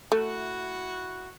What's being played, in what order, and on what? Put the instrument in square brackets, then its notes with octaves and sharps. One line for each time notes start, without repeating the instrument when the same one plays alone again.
[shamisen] A3 [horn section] E4 F#4